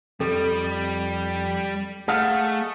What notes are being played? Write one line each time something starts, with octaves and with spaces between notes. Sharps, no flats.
F2 G3 A4
A3 G#4 D#5 F5 F#5